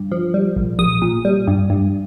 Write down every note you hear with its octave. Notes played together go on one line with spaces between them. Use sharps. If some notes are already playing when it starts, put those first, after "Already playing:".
Already playing: G2
F3
G3
A#1
A#1 D#6
A#2
G3
G2
G2